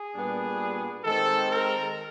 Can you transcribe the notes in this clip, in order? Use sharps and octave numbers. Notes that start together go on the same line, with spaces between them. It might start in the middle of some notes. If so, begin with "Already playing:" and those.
Already playing: G#4
A#2 G3 B3 D4
D#3 G#3 C4 A4
A#4